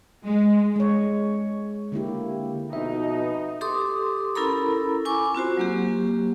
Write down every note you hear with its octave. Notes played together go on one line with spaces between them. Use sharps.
G#3
G#3 C#5
D3 A#3 E4 G4
F2 B2 D#4 E5
G4 A4 C6 D6 D#6
C#4 E4 A4 A#4 A#5 B5
E4 G#5 C#6 D6
C4 F4 F#4 C5
F#3 A#3 G4